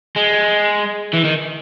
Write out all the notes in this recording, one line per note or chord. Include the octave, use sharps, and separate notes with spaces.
G#3
E3
D#3